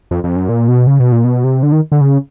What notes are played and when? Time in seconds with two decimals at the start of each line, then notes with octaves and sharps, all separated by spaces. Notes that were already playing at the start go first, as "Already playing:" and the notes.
0.11 F2
0.24 F2
0.36 F#2
0.49 A#2
0.68 B2
0.87 C#3
1.00 B2
1.12 A#2
1.24 B2
1.44 C3
1.63 D3
1.72 D#3
1.92 D3
2.01 C#3